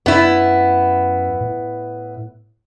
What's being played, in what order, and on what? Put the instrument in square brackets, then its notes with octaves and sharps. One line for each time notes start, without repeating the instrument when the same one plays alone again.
[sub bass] F#2 [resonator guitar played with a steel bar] B3 E4
[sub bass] A2